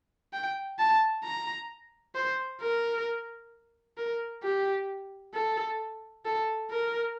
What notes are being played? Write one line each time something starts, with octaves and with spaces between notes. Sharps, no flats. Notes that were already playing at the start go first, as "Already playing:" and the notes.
G5
A5
A#5
C5
A#4
A#4
G4
A4
A4
A#4